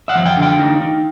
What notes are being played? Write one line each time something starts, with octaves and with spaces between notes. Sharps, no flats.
E5 F#5
F3
F5 G5
D3
F5 G5
D#4
D#4